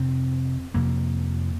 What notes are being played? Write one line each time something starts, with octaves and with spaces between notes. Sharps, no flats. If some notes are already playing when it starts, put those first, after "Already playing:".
Already playing: F2 C3 C4
F2 C3 A#3